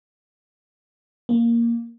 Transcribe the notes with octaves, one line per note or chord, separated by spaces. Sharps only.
A#3